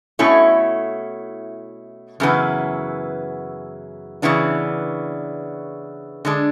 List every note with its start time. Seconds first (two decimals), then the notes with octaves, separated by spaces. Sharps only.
0.19 B2 A3 C#4 E4
2.20 F#2 C#3 E3 B3
4.22 C#3 E3 B3 D4
6.25 D3 G#3 D4